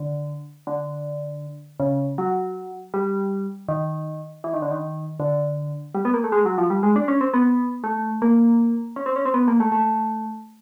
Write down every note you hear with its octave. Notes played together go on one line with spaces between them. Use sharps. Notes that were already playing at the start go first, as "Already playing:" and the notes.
Already playing: D3
D3
C#3
F#3
G3
D#3
E3
D#3
D3
D#3
D3
G3
B3
A#3
A3
G#3
F#3
F3
G3
G#3
D4
C#4
C4
B3
A3
A#3
C#4
C4
C#4
C4
B3
A#3
A3
A3